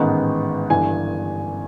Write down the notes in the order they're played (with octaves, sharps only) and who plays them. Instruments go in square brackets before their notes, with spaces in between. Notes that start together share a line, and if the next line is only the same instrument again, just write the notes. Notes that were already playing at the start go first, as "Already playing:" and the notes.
Already playing: [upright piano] A1 G#2 D#3 G#3 B3
G1 G2 E3 G#5